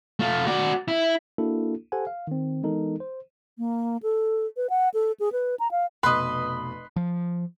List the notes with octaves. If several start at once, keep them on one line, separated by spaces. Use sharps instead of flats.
A3 F4
F#4 D5
E4
A#3 D4 E4 F#4 A4
G4 A4 C5 F#5 G#5
F5
D#3 C4
E3 G#3 B3 D#4 A4 A#4
C5
A#3
A4
B4
F#5
A4
G#4
B4
A#5
F5
F1 B2 B4 D#5 B5 C6 F#6
F3